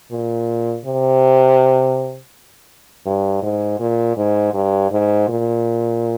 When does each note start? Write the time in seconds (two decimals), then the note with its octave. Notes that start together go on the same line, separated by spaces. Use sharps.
0.11 A#2
0.85 C3
3.06 G2
3.43 G#2
3.79 A#2
4.17 G#2
4.54 G2
4.91 G#2
5.28 A#2